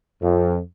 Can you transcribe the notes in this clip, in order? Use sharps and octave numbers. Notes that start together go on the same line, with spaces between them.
F2